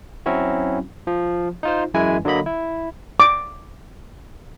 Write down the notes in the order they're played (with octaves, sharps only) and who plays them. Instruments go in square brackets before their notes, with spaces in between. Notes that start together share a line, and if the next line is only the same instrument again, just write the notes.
[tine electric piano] F#3 C4 C#4 E4 F#4
F3
D#4 F4 C5
F#2 E3 G#3 E4 B4 G#5
D3 F#3 A#3 D#5 B5
E4
[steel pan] D6